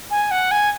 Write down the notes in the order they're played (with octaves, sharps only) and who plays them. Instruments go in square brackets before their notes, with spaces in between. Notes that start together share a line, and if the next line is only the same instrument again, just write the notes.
[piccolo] G#5
F#5
G#5